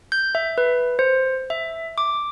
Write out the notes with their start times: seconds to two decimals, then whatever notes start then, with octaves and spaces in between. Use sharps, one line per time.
0.12 G6
0.35 E5
0.58 B4
0.99 C5
1.50 E5
1.98 D6